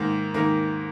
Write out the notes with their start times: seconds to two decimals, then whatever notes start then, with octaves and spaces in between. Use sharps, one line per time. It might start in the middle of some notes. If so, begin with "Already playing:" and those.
Already playing: G#2 D#3 A#3
0.34 G#2 D#3 A#3